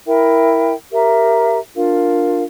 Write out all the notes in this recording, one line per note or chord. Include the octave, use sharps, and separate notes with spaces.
E4 A#4 E5 G5
G4 A#4 E5 A#5
D4 F4 A#4 F5